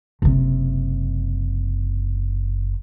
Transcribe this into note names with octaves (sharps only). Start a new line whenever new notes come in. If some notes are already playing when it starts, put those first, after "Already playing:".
F#1 C3